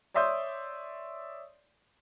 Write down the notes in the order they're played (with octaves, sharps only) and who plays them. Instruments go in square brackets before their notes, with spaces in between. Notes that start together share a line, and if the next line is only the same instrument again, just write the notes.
[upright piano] C#5 D5 E5 C6 D#6 G6